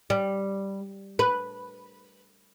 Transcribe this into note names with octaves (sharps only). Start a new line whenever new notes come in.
G3
B4